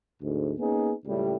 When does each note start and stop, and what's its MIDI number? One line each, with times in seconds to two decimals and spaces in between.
0.21 0.52 38
0.21 0.52 44
0.58 0.92 58
0.58 0.92 59
0.58 0.92 61
0.58 0.92 63
0.58 0.92 68
1.06 1.34 37
1.06 1.34 45
1.06 1.34 49
1.06 1.34 55